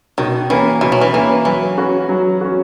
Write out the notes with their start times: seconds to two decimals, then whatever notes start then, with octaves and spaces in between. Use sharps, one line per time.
0.18 B2 D#3
0.49 E3 A#3 C#4
0.81 B2 E3
0.92 F#3
1.01 E3
1.13 E3 A#3 C#4
1.45 E3 F#3
1.77 C#4 F#4
2.09 F#3
2.41 C#4 F#4